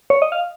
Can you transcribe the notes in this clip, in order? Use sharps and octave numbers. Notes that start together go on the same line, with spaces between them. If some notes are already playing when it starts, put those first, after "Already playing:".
C#5
D#5
F5